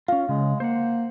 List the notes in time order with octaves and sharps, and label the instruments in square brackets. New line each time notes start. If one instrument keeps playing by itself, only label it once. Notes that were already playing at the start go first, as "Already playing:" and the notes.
[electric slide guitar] C#4 F4 [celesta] F5
[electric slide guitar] C#3 [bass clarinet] G#3
[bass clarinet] A#3 [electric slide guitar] C5 F#5